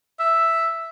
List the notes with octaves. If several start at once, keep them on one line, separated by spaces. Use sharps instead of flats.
E5